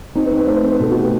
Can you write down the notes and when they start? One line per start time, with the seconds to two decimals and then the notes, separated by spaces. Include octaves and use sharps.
0.15 C4 D#4
0.26 B4
0.31 C4
0.37 B4
0.47 A3 C5
0.55 B4
0.63 C4
0.72 B4
0.79 B2 A4
0.91 F#4
0.96 A3 G4